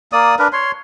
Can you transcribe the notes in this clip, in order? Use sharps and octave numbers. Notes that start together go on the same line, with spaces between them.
A#3 D5 D#6
D4 A#4 B4
C#5 C6